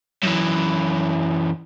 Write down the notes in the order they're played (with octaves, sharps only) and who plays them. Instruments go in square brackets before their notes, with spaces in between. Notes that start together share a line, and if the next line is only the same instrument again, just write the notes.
[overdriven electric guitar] F#2 E3